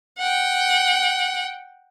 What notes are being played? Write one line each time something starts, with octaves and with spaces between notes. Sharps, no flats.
F#5 G5